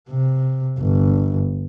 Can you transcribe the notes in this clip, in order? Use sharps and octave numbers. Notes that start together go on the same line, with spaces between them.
C3
G1